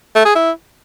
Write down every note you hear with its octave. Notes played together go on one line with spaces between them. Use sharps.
A3
G#4
E4